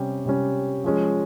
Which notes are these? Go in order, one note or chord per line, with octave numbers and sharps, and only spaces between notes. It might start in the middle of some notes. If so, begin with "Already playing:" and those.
Already playing: C3 G3 C#4 G4
C3 G3 C#4 G4
F3 G#3 C#4